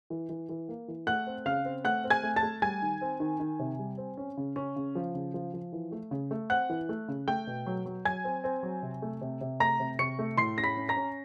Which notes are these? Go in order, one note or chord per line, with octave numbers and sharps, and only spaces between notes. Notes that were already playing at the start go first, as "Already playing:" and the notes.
E3
E3
E3
A#3
E3
A3 F#5 F#6
C4
C#3 F5 F6
C4
A3 F#5 F#6
C4
G#5 G#6
A3
A5 A6
A3
G3 G#5 G#6
D#3
C4
D#3
D#3
C3
G3
C4
C#4
C#3
C#4
C#3
F3
C#3
F3
F3
E3
A3
C#3
A3
C4 F#5 F#6
E3
A3
C#3
A3 G5 G6
B2
F#3
F#3
F#3 G#5 G#6
C4
C4
F#3
C3
A3
C3
C3
A3 A#5 A#6
C3
C3 C#6 C#7
A3
A2 C6 C7
C#4 A#6
B5 B6
C#4
A#5 A#6
C#4